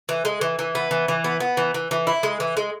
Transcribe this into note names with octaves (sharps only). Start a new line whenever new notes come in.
E3
G#3
E3
E3
B3
E3
E3
B3
B3
E3
E3
E3
E4
G#3
E3
G#3